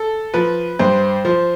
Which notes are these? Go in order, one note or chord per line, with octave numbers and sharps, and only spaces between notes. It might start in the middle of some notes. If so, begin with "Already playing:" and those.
Already playing: A4
F3 B4
G2 C5
F3 C5